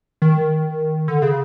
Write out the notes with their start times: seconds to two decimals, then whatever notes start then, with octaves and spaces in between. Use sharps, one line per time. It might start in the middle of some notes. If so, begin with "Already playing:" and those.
0.22 D#3
1.08 D3
1.22 C#3